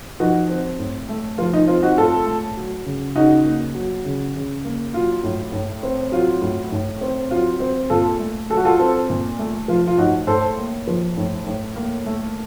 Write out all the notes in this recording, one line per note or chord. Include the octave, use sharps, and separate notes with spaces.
F3 D#4 F#4
C4
A2
A3
F3 F4
D#4
C4 F4
D#4 F#4
A2 F4 A4
A3
F#3
C#3
C#3 D#4 F#4
A#3
F#3
C#3
C#3
A#3
F#3 F4
A2
A2
C4
F#3 F4
A2
A2
C4
F#3 F4
C4
A#2 F4 A4
A3
F#3 A4
F#4
F4 A4
C4
A#2
A3
F3 F4
F4
A2 D#4 F#4
A2 A4 C5
A#3
F3
A2
A2
A#3
A3